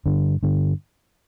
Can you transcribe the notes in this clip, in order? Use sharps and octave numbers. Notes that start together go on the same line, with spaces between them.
G2 D3
G2 D3